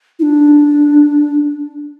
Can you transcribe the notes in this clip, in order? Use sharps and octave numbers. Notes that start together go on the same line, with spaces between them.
E4
D4